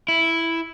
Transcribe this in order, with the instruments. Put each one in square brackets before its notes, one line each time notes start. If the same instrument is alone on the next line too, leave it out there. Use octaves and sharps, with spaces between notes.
[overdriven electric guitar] E4